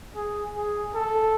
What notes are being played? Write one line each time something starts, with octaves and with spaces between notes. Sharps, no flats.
G#4
G#4
A4